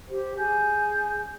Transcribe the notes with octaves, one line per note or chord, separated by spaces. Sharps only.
G4 C5
G#4 G#5 G6